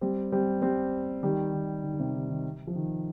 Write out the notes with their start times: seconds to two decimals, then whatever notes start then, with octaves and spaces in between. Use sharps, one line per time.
0.01 G3 C4
0.32 G3 C4
0.62 G3 C4
1.23 D#3 G3
1.53 D#3
1.84 D#3
1.94 D#3
2.00 C3
2.14 D#3
2.29 D#3
2.67 F3
2.75 D#3